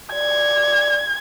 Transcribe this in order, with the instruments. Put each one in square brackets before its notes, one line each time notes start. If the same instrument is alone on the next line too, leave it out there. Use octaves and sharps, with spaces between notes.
[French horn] D5 [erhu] G#6